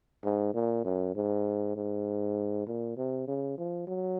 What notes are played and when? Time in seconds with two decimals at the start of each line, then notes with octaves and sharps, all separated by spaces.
0.25 G#2
0.54 A#2
0.85 F#2
1.15 G#2
1.76 G#2
2.67 A#2
2.97 C3
3.27 C#3
3.58 F3
3.88 F#3